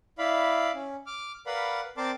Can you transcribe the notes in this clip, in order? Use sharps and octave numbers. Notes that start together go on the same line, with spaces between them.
E4 D5 F5 B5
C#4
D6 F6
A#4 B4 D5 F5 F#5 B5
C4 A#4 D5 A5 C6 D6